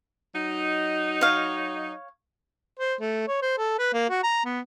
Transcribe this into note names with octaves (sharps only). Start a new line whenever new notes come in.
F#3 D#4
C#5 F5
C5
A3
C#5
C5
A4
B4
A#3
F#4
A#5
B3